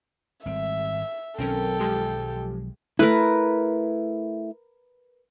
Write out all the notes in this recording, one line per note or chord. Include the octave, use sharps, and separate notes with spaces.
G#1 G3 C4 E5
B1 D#3 F#3 C4 C#4 A4 A#4 G5
F3 G#3 G4
A3 E4 A#4 B4